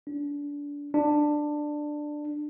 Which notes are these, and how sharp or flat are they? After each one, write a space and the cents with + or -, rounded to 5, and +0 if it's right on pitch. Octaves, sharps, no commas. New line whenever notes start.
D4 -25
D4 +15